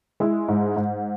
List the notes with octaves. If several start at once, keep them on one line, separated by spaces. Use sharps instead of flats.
G#3 E4
G#2
G#2